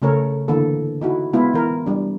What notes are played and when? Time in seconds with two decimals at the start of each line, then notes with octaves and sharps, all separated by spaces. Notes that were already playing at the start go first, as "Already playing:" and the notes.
0.02 C#3 A3 A4 A#4 C#5
0.48 D3 E3 A#3 A4
1.01 D#4 E4 F#4
1.33 G#3 B3 E4 F4
1.54 E3 A#4
1.86 G3 D4